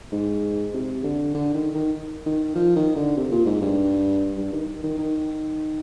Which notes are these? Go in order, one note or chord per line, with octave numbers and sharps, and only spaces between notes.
G#2
C3
D3
D3
D#3
D#3
D#3
F3
D#3
D3
C3
A#2
G#2
G2
G2
D#3
D#3
D#3
D#3